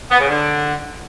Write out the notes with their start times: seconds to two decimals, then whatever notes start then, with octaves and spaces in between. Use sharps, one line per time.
0.11 B3
0.20 C#3
0.29 D3